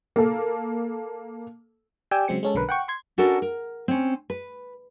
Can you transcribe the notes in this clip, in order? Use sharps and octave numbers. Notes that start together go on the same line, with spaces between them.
A#3 A4
G4 D5 G5 G#5 E6
C#3 F#3 G#3 C4 C#7
G#3 C#4 A4
B1 D3 A#4 B4
F#5 G5 C#6
C6 G#6
C#4 D4 F#4 A4 A#4
A#4
C4 C#4
B4